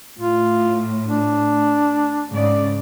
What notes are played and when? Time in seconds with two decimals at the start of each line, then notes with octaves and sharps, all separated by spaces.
0.19 A2 F4
1.06 D4
2.31 G#2 C#3 D5